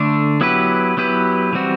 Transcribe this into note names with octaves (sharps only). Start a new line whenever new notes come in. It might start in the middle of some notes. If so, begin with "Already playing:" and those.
Already playing: D3 A3 D4
F#3 B3 E4 G4 B4
F#3 B3 E4 G4 B4
E3 G3 C4 F#4